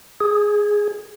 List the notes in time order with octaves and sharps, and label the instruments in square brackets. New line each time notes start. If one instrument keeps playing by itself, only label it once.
[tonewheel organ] G#4